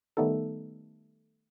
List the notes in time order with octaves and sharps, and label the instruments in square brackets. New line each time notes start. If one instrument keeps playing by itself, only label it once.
[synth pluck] D#3 G3 A3 B3 D#4 A4